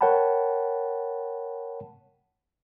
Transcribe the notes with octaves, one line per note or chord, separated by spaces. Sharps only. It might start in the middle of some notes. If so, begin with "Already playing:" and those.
A#4 C#5 F#5 G5 A5 B5